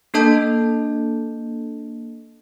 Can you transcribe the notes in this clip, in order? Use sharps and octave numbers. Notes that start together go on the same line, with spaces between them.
A#3 D4 A4 D#5 A5 G6